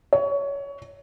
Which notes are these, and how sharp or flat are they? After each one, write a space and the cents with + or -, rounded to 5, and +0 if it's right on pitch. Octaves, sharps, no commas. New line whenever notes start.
C#5 +20